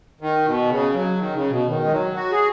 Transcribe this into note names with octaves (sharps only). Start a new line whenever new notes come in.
D#3
B2
C#3
F#3
D#3
C#3
B2
D#3
G#3
F#3
F#4
G#4